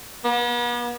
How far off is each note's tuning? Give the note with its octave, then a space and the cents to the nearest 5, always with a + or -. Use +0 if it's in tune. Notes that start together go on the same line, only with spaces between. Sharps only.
B3 -45